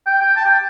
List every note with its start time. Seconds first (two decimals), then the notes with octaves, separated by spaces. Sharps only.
0.06 G5
0.21 G5
0.36 A5
0.45 G5